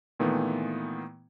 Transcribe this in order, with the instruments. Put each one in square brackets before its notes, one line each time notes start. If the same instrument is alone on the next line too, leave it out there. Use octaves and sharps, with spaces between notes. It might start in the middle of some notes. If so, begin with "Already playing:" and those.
[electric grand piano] A#2 D#3 E3 A3 B3